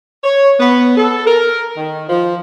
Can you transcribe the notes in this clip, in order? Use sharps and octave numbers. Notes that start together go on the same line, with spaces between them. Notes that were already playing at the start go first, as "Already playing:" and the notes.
C#5
B3
A4
A#4
D#3
F3